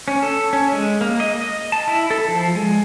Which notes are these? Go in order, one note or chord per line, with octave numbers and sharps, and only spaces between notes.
C#4
A4
C#4
G#3
A#3
D#5
D#5
A5
E4
A4
F3
G#3